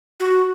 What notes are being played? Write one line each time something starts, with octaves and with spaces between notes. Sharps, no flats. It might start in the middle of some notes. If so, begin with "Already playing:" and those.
F#4